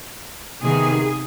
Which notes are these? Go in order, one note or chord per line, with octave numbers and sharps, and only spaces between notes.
C3 D#3 B3 G#4